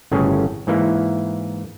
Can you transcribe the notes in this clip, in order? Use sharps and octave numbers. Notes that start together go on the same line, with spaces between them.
G1 A2 C#3 C#4 G#4
G#2 E3 A#3 E4